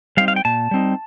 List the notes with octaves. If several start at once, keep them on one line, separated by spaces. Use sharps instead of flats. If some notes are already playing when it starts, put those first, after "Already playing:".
G3 C4 D#4 F5
F5
G5
A#2 A5
G3 C4 D#4